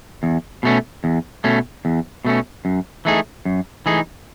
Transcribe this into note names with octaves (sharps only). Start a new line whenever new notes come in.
E2
B2 A3 C#4
E2
B2 A3 C#4
E2
B2 A3 C#4
F#2
E3 A3 D#4 G#4
F#2
E3 A3 D#4 G#4